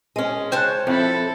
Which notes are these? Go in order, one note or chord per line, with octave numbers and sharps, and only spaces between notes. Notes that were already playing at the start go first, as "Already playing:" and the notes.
G#3 C#4
C5 C#5 G5 A5 F#6
F2 E4 A4